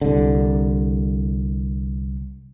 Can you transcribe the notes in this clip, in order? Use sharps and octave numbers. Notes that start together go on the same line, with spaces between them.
C2 D3